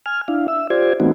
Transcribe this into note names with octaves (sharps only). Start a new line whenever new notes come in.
G#5 F6
D4 E4 F5
E5 E6
F4 G4 C5 D5 G#6
E3 A3 B3 C4 D#4 F#4